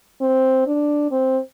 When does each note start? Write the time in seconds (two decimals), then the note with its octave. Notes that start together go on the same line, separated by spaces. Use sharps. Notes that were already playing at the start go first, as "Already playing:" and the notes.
0.21 C4
0.67 D4
1.12 C4